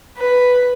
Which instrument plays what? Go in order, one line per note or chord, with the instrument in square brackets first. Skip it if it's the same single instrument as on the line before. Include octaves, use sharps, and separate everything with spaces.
[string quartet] B4